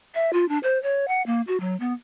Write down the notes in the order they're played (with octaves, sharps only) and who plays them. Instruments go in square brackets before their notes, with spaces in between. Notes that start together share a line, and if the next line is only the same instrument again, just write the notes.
[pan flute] E5
F4
D4
C5
C#5
F#5
A#3
F#4
F#3
B3